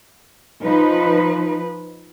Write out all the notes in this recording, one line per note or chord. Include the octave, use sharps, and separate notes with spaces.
F3 D#4 B4